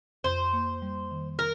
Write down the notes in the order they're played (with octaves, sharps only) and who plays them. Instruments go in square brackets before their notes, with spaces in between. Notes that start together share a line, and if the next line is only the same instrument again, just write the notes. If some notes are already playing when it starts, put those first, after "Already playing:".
[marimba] F2 [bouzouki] C5
[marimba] A#3
G3
D#3
[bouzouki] A#4